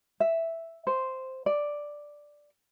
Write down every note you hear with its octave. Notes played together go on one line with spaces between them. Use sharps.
E5
C5
D5